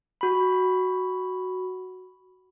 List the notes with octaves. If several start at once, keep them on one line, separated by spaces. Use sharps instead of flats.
F#4 B5